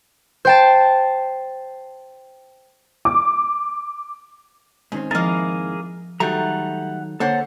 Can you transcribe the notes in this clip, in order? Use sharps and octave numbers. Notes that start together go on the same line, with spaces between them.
C5 G5 A5
D6
G#2 D#3 C4 C#4
F3 A#3 E4 G#4 A#4 A6
D#3 F#3 G3 A3 F#5 A#5
D3 A#3 A4 C5 C#5 F#5